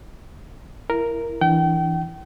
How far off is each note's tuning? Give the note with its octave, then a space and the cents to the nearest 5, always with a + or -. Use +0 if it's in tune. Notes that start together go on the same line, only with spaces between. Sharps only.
E4 +20 A#4 +0
E3 +0 D4 +0 G5 -35